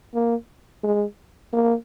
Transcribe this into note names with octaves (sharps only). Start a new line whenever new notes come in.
A#3
G#3
A#3